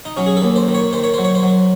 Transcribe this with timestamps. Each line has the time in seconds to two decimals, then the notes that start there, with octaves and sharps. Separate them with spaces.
0.05 D#4
0.17 F#3 C#4
0.26 G#4
0.37 A4
0.42 D#2
0.56 C5
0.68 D#3
0.74 C#5
0.93 D#3 C5
1.04 C#5
1.14 F#3 C5
1.25 C#5
1.35 C5
1.43 F#3